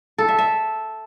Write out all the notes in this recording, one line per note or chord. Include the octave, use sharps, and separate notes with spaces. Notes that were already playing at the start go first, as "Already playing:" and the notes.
A4
E5
E5